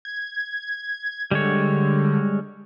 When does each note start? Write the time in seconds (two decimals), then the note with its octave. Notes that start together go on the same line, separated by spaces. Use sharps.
0.05 G#6
1.31 D3 G3 G#3 C#5